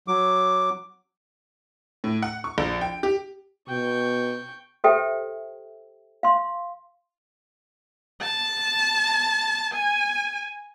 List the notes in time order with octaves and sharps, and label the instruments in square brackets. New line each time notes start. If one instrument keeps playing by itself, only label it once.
[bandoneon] F#3 D6
[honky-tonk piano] A2
F#5
C#6
A#1
G5
G4
[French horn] B2 [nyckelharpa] G5 C#6
[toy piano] G4 A4 C5 E5 G5
F5 C6
[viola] A5
G#5